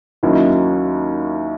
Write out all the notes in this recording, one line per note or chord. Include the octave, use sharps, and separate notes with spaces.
D#2 D#3 F#3 C#4 E4